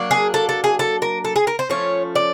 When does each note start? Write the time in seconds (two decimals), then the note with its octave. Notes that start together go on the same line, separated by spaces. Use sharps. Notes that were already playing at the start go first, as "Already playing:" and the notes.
Already playing: F#3 A#3 D4
0.11 G#4
0.34 A4
0.49 A4
0.64 G#4
0.79 A4
1.02 A#4
1.25 A4
1.36 G#4
1.47 A#4
1.59 C5
1.70 F3 A3 C#4 C#5
2.15 D5